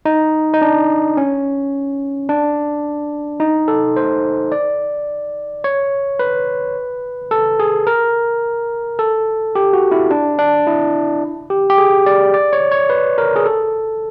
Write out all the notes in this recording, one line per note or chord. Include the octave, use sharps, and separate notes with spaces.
D#4
D#4
D4
C#4
D4
D#4
A4
C5
D5
C#5
B4
A4
G#4
A#4
A4
G4
F#4
E4
D4
D4
E4
G4
G4
G#4
D5
D5
C#5
C#5
B4
A#4
G#4
A4